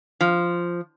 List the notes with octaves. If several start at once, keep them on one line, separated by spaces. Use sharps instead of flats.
F3